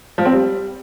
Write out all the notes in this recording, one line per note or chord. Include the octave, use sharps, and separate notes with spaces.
F3
C4
G3